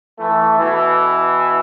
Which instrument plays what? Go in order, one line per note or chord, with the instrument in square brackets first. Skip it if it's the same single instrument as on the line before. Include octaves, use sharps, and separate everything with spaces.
[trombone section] E3 A3
B2 E3